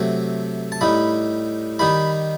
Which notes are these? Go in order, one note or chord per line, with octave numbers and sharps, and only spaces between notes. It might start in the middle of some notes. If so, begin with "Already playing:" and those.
Already playing: C3 F#3 A3
A5
A2 G3 D#4 B5
D#3 G3 D#4 B5